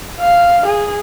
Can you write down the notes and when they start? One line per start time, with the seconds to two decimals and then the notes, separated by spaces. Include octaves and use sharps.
0.19 F5
0.65 G#4